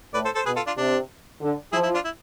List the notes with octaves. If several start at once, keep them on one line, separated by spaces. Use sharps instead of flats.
A2 B4 D5
A4 C5
A4 C5
B2 G#4 B4
F4 A4
D4 F4
C3 D4
D3
F3 E4 G#4
E4
D4 F4
E4